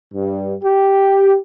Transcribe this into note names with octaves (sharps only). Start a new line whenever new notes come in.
G2
G4